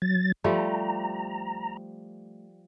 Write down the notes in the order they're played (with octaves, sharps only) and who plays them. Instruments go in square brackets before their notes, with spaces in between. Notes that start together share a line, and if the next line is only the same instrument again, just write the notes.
[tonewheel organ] F#3 A6
[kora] F3 G3 A3 [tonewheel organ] A#5